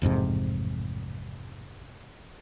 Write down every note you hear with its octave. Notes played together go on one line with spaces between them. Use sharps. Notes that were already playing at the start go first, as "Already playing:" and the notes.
A1 F2 G#2 C3